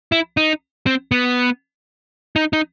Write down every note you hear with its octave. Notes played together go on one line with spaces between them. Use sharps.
E4
D#4
C4
B3
D#4
D#4